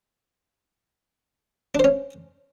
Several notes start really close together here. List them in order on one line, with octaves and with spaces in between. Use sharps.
D4 C5 C#4